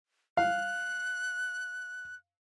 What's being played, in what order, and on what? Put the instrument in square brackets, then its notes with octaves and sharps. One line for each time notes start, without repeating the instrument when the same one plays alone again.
[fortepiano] F5 [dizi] F#6